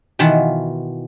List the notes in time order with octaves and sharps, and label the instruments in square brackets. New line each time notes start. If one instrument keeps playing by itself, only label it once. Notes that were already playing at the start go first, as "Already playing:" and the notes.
[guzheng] B2 D#3 E3 F4 F#5 A5